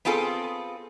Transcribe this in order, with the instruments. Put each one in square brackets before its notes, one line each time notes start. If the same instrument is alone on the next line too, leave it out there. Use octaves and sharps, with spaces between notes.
[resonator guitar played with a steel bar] B3 C4 F4 G#4 A4